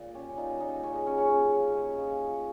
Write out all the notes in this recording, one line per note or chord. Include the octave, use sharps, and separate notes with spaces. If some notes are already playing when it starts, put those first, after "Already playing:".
Already playing: A#2
C#4 G4
A#2 D#4
A#2 D#4
C#3 C#4
D#4
C#3 C#4
C#4
C#3 C#4
F3
F3 G#4
F3
F3